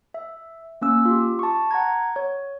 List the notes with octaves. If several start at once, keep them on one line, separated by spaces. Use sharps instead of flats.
E5
A#3 C#4 E6
F4 G4
A5 C#6
F#5 A#5 G#6
C#5